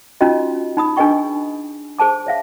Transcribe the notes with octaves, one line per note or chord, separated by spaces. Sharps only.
C#4 D#4 F4 F#4 D#5
D#4 B5 D#6
D4 G#4 B4 D#5 G5 C#6
G#4 C5 A5 D6
C#5 E5 F5